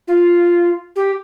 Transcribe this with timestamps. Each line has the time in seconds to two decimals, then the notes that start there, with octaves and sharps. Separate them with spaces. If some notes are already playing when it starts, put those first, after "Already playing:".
0.08 F4
0.96 G4